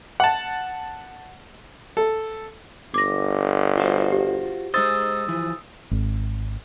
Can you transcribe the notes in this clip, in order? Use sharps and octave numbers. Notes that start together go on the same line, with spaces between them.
F#5 A5
A4
G1 D6 A#6
F4 F#4 C5
G4
G#3 D#4 C5 D#6 E6 A6
E3 F3
G#1